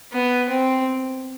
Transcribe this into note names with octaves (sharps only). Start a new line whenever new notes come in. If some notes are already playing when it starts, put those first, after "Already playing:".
B3
C4